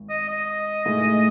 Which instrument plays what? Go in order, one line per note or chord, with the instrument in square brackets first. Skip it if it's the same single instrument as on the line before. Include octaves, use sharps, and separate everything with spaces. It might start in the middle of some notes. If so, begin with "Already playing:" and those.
Already playing: [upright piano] G#1
[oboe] D#5
D#5
[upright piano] A2 G#3 D#4 G#4